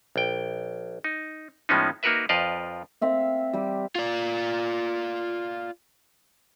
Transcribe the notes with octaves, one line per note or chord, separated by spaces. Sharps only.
A#1 G5
D#4
A2 F3 G#3 B3 C#4 D#4
A#3 D#4 F#4 A#4 B4 E5
F2 F3 B4 D5 D#5 F5
C4 E5 F5
G3 G4
F4 D5